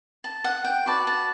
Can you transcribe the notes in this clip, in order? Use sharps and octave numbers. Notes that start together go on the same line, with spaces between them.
A5
F#5
G5
F#4 B4 D5 A5
A5